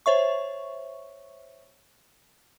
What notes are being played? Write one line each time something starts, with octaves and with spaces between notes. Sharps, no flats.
C5 C#5 E5 C#6